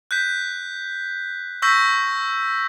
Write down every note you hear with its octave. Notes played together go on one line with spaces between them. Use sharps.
F#6 G6 B6
C#6 E6 G6 A#6 B6